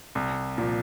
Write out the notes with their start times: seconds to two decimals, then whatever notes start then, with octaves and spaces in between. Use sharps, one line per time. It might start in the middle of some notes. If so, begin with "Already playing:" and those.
0.15 C2
0.58 A#2 F3